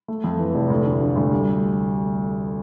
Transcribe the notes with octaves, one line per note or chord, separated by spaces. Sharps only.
A3
F2
E3
F1
D2
D3
F3
D2
G3